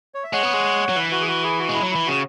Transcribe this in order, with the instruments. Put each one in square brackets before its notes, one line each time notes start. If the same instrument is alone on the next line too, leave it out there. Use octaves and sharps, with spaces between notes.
[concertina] C#5
E5
[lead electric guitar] G#3 [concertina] C#5 F#5
[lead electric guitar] B3
G#3
F#3
[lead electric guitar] E3 [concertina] B4 E5
[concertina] F#4 B4
G#4
F#4 B4
E4 G#4
F#4
[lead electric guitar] G#3
[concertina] E4
[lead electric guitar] F#3
[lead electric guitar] E3 [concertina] E4
[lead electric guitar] C#3 [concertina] F#4